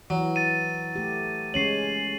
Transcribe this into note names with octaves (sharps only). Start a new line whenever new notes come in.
E3 F#3
A6 D#7
A3 G4
G#3 C#4 C#5 C7 D#7 F#7